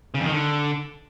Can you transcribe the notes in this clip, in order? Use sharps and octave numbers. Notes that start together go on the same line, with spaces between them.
C#3
F2
D#3
D3